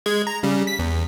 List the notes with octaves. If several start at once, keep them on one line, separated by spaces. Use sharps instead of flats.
G#3 G#6
A#5
C#3 G3
B6
E2